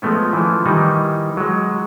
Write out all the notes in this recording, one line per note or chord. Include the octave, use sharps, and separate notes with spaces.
F3 G#3 A3 B3 C#4
E3 F3
D#3 E3 G3 D#4
F#3 G#3